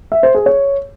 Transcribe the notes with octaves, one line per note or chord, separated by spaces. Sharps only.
E5
C5
G#4
C#5